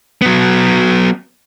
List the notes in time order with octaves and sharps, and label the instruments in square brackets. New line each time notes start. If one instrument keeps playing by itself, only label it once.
[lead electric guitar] F#3 B3